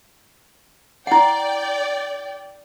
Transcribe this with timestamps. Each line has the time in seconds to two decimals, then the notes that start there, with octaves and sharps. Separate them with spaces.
1.07 E4 D5 F#5 G5